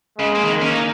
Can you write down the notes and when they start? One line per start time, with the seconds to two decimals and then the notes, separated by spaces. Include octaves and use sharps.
0.18 C#3 G#3
0.35 A#3
0.44 D#3
0.53 A#3
0.62 C#4
0.70 D#4